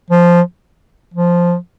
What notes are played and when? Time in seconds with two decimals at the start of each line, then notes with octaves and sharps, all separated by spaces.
0.10 F3
1.14 F3